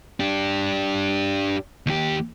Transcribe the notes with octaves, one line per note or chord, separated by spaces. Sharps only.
D4 G4
D#2 G4